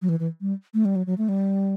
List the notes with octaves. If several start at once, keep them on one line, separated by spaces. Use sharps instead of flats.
F#3
E3
E3
G3
A3
G3
F#3
F#3
A3
G3